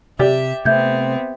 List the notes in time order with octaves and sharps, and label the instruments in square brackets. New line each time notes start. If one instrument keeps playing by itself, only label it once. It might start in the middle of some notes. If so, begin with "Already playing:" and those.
[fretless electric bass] C3 [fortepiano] G4 D5 [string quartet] E5
[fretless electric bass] C3 A3 [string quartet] B3 C4 [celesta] E5 G6 G#6